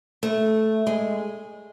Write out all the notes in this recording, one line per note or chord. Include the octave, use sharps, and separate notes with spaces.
A3
G#3